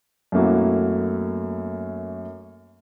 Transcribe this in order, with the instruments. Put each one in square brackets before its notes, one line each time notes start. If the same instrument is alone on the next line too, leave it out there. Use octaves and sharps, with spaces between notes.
[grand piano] F#2 B2 A3 A#3 E4 F#4